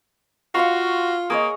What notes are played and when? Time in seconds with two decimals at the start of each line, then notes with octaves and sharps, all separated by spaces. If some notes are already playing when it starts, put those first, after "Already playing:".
0.55 F4 F#4 F5 C6 C#6
1.30 A#3 G#4 C#5 D#5